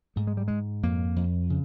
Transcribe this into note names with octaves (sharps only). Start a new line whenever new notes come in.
G#2 A3
G#3
G3
G#2 G#3
F2 A#3
F2
C#3